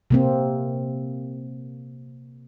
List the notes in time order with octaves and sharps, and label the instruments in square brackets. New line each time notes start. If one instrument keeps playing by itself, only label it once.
[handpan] C3 A#3 C4